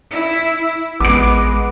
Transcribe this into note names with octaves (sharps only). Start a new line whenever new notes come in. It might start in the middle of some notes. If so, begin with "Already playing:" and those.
E4
A1 G#3 B3 D6 D7